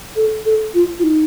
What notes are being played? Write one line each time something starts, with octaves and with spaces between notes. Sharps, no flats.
A4
A4
F4
F4
D#4